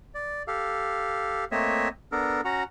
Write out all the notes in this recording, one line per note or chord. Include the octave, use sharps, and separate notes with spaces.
D5
G4 A4 F5
A3 A#3 C4 C#5 D#5 E5
B3 D4 A4 A#4
C#4 F#4 F#5 A#5